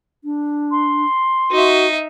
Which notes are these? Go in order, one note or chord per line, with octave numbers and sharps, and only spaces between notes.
D4
C6
D#4 F#4 E5